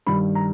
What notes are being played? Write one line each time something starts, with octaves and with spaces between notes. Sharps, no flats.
G2 D#3 G3 B5
A#5